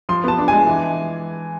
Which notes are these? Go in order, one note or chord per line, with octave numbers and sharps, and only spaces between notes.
F3 C6
B3 A5
D4
G#3 G#5
E3